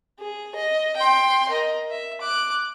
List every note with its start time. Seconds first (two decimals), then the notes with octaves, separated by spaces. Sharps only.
0.19 G#4
0.55 D#5
0.96 G5 C6
1.49 A#4 D#5
1.90 E5
2.21 D6 F#6